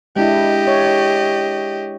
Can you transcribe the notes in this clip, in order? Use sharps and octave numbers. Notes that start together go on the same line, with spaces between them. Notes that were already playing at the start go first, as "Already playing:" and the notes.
G#3 D4 E4 G4 D#5
C#5